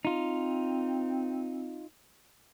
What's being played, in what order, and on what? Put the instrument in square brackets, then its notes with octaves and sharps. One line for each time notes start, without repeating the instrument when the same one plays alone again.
[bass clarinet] C4 [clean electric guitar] D#4 F4